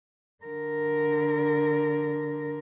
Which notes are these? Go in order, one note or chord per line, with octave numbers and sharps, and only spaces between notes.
D3 A#4